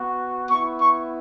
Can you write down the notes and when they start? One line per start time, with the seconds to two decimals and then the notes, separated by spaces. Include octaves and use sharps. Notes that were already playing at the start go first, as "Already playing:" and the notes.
Already playing: B3 F#4
0.50 B3 E4 C#6
0.79 C#6